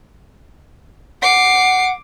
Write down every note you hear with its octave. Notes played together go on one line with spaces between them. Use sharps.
F#5 D6 C7